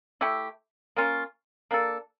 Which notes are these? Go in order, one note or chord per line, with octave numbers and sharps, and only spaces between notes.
A3 E4 G4
A#3 C#4 F4
A#3 D4 A4